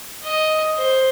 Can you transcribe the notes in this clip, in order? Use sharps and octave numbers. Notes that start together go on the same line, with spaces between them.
D#5
C5